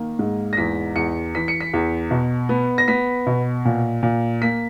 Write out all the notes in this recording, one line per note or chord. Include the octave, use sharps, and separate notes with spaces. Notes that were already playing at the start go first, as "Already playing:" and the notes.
Already playing: D#3 A#3
G#2
A#6
E2 B6
E2 C#7
E3 B6
C#7
B6
E2
B2
B3
A#6
B3 B6
B2
A#2
A#2
A#3 B6